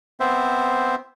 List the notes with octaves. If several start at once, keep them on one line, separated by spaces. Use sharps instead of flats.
B3 C4 C5 E5